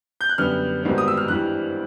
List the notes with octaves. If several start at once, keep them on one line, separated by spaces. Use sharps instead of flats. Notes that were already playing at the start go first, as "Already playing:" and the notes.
G6
F#6
F#2 D3 G3 B3 F6
G#1 G#2 D#3 G3 B3
D#6
E6
F6
G2 E3 G3 F#6